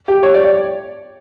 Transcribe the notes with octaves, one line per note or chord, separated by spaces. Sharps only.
G4
C#5
D5
D5